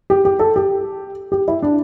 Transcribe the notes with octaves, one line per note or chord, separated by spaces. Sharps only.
G4
G4
A4
G4
G4
E4
D4